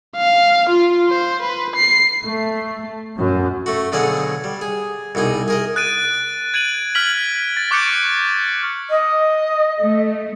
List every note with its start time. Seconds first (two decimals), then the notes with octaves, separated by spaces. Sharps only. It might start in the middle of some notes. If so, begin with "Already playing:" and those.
0.17 F5
0.70 F4
1.08 C5
1.43 B4
1.76 C7
2.23 A3
3.18 F#2
3.66 A3 F#4
3.92 B2 D3 F#3 G#4 F5 F#5
4.44 G3
4.61 G#4
5.15 C2 B2 D#4 G#4
5.48 G#4 A#4 D#5
5.76 F#6 A6 D7 D#7
6.54 G#6 D7 D#7 F#7
6.95 F6 G#6 B6 F#7
7.57 A6
7.71 C#6 D6 F#6 G6 C#7 D7
8.90 D#5
9.81 A3